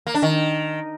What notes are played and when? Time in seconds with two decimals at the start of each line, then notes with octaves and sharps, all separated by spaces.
0.07 A#3
0.14 D4
0.22 D#3